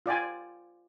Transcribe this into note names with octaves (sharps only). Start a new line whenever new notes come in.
F4 D5 G5 G#5